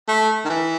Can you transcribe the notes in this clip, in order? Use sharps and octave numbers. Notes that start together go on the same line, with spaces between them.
A3
D#3
E3